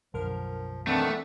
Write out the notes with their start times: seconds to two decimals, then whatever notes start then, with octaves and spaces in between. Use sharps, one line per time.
0.14 B1 F#2 D3 F3 A#4 F6
0.87 D#3 E3 A3 B3 C4 D4